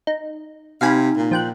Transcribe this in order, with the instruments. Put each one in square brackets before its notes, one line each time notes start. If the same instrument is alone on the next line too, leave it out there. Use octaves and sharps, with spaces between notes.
[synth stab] D#4
[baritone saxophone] C3 [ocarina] D#4 [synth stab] F5 G#5 B5
[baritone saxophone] A#2
[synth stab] F3 G5 F#6